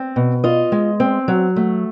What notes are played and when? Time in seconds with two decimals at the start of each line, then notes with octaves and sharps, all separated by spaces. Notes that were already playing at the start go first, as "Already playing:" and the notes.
Already playing: C4
0.16 B2
0.44 F4 D#5
0.72 G#3
1.00 C4
1.28 F#3
1.56 A3